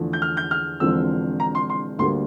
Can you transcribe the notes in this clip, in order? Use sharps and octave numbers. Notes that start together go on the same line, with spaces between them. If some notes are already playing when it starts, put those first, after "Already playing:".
Already playing: E2 D3 F3 A3
G6
F6
G6
F6
E1 E2 D3 F3 C4 E6
A#5
C6
C6
D2 D3 G3 A#3 C6